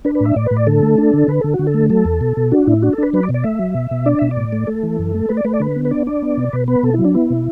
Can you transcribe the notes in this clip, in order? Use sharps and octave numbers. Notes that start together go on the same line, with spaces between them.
D4 B4
B4
A2 E5
A2 D5
A2 B4
D5
D3 A4
A3
D4
D3
D3 B4
D3 A4
F#4
D3
A4
A3
F#3 A4
E2
B2
B2
D4 F#4
A2 E4
D4 F#4
A4
D4 B4
F#3 B4
D5
B2
D5
A3 E5
F#3
B2
B2
D4 D5
B2 E5
D5
A2
A3
A3 A4
E3
F#2
A3
A3 B4
D5
A3 B4
D5
D3 B4
B3
B4
D4 D5
D4 D5
B3
B2
B2 B4
B3 B4
B2 A4
F#3 E4
D4
B3 E4
B2